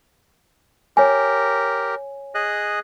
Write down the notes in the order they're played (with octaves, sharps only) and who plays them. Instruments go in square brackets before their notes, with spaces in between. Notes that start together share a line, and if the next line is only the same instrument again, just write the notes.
[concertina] G4 A#4 [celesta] C#5 G#5
[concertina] G#4 D#5 F#6